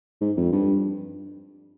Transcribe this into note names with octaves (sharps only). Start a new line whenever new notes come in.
G#2
F2
G2